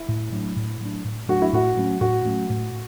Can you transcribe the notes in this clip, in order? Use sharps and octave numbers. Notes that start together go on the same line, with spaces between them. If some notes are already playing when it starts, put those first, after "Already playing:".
Already playing: E4
A2
F#3 A3 D4
A2
F#3 A3 D4
A2
F#3 A3 D4 F#4
E4
A2 F#4
F#3 A3 C#4
A2 F#4
F#3 A3 C#4
A2